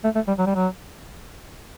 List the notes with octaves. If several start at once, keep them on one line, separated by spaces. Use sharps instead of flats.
A3
A3
G3
F#3
G3
F#3